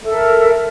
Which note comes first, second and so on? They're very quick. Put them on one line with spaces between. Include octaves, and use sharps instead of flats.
A4 E5 A#4